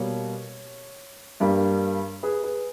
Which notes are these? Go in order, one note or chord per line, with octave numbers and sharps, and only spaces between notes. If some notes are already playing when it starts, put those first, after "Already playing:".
Already playing: B2 G3 A#3 C#5
G2 G3 A#3
G#4 B4
G#4 B4